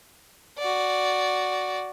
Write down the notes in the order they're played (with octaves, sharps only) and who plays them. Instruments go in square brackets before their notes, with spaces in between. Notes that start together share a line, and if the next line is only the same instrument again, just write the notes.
[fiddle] F#4 D5